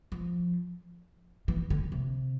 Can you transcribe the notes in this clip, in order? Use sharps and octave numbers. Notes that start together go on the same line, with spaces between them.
F3
E3
D3
C3